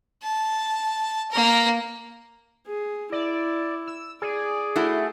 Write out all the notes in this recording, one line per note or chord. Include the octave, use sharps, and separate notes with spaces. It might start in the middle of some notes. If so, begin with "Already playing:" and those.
A5
A#3 A#4
G#4
E4 D5
E6
G#4 D5
A3 E4 F#4